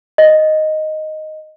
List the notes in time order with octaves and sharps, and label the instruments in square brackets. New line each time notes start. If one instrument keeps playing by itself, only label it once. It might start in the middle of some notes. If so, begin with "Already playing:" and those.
[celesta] D#5